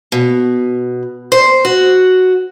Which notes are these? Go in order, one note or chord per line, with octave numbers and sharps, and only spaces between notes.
B2
C5
F#4